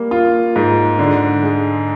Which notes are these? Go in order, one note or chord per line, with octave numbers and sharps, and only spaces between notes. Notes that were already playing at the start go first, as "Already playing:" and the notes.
Already playing: G3 A#3
F4
G#2
D3
G#3